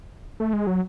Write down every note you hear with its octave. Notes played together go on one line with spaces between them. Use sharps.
A3
G#3
F#3